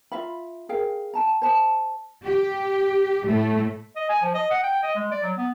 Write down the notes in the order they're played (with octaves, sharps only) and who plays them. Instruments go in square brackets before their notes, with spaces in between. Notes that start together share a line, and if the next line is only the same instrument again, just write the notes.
[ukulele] F4 E5 F5 B5
G#4 A#4 F5 G5
G5 A5 A#5
C5 A5 B5
[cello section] G4
A2 A3
[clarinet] D#5
G#5
F3
D#5
F#5
G5
D#5
G#3
D5
F#3
B3